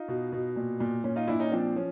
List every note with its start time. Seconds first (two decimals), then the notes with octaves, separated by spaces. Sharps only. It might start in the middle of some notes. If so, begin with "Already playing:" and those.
Already playing: D#4 F4
0.08 B2
0.32 B2
0.56 A#2
0.80 A#2
1.04 A#2 C#4
1.16 D#4 F4
1.28 A#2 D4 E4
1.40 C#4 D#4
1.52 F3 C4 D4
1.76 F3 C#4